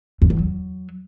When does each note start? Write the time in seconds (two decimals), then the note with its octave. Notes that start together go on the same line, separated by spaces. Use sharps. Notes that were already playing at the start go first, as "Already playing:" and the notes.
0.22 F2
0.30 E2
0.39 F#3